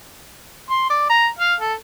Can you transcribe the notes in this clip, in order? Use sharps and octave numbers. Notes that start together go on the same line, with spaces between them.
C6
D5
A#5
F5
A4